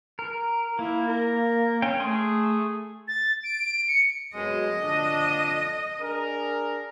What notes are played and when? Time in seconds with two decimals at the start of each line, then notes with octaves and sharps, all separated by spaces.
0.19 A#4
0.79 A#3 E4
1.08 A#4
1.82 C#4 G5
2.00 A3 G#4 G#5 C6
3.08 A6
3.44 D7
3.88 C#7
4.35 F#2 B2 G#3 D#5
4.80 D3 F3 D4
6.00 D4 G#4 A#4